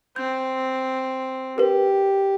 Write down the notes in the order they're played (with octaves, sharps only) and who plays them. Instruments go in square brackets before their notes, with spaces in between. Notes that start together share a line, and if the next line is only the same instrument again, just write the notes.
[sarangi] C4 [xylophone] G6
[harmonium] G4 [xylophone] A#4 B4